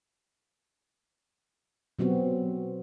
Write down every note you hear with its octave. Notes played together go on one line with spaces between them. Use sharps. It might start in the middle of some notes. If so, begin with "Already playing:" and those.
B2 F#3 B3 C4 F#4